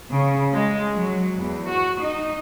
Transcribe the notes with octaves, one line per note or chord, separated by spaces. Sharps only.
C#3
G#3
F#3
E2
F#4
D#4